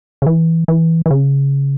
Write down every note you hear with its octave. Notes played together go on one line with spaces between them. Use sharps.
C#3
E3
E3
E3
C#3